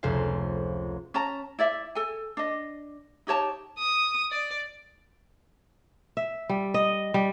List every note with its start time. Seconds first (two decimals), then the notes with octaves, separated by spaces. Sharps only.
0.03 F1 C#2 C5 F5
1.14 C#4 A5 A#5
1.59 E4 D5 E5
1.95 A4 G#5
2.37 D4 D#5
3.27 D#4 G4 C#5 A5
3.79 D#6
4.31 D5
6.17 E5
6.49 G3
6.74 D#5
7.14 G3